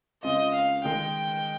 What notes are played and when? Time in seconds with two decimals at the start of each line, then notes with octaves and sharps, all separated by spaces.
0.23 C#3 G#3 C4 F4 D#5
0.54 F5
0.84 D#3 G#3 D#4 G5